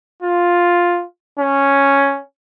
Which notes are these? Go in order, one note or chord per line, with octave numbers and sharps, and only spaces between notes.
F4
C#4